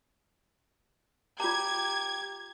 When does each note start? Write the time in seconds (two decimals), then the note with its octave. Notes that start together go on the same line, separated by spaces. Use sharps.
1.40 F4 G4 A#5 G#6